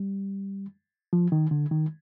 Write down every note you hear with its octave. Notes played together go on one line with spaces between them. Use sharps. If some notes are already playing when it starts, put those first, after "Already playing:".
Already playing: G3
F3
D#3
D3
D#3